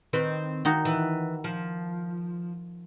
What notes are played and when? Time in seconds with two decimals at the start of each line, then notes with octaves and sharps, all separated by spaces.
0.13 D#3 C4 B4
0.65 D#3 D#4 F#4
0.85 E3
1.44 F3